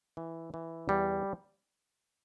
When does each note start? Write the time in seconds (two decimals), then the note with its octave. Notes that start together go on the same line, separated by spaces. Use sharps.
0.17 E3
0.54 E3
0.89 E2 G3